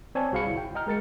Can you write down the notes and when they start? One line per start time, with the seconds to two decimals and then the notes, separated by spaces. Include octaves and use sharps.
0.15 C4 C#5 D5 G#5 A5
0.32 C2 F#4 G#4 F5 B5 C#7
0.44 G1 E4
0.58 G5
0.75 D#5 G5 A#5 F6
0.87 G#3 A#4 A6 C#7